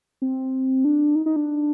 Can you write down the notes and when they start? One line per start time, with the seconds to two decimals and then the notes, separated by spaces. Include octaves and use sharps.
0.22 C4
0.85 D4
1.15 D#4
1.26 D#4
1.36 D4